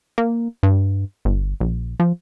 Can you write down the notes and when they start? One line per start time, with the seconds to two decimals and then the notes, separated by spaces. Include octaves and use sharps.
0.18 A#3
0.63 G2
1.25 G1
1.60 A#1
2.00 F3